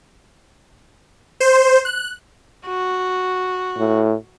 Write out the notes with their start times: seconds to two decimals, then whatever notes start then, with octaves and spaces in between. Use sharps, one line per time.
1.40 C5
1.85 F#6
2.66 F#4
3.78 A2